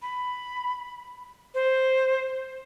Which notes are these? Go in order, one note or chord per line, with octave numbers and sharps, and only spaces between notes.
B5
C5